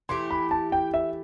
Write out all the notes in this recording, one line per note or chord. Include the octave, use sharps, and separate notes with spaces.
E3 A3 E4 G4 C6
B5
A5
G5
E5